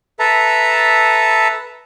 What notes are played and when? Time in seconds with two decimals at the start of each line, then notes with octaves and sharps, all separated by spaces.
0.19 A4 B4 E5 A5 A#5